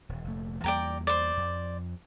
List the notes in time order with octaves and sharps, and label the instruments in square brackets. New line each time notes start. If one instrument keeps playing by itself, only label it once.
[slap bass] D#1
F1 A#2 A3
[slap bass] E2 G3 A#3 [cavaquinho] D5 G5 A#5
[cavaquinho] C5 D5
[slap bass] F2